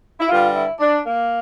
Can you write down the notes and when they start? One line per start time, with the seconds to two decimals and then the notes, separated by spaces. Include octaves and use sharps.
0.20 E4
0.29 G2 D3 G3 F4
0.54 E4
0.80 D4
1.04 A#3